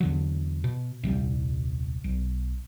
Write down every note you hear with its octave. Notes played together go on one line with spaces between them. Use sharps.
E2 D3 F#3
B2
D#1 C2 G3
B1